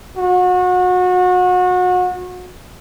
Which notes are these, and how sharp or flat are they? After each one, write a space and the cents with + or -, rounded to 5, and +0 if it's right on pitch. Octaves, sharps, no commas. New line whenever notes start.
F#4 -30